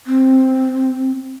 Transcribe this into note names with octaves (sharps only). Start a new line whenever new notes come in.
C4